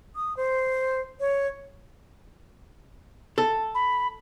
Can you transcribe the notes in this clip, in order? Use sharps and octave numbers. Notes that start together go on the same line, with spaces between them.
D#6
C5
C#5
A4
B5